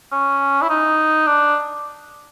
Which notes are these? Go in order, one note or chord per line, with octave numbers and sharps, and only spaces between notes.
C#4
E4
D#4
D4